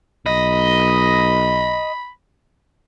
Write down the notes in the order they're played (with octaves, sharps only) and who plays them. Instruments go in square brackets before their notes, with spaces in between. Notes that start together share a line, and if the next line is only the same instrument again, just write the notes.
[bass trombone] B1 [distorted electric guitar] D#5 [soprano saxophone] B5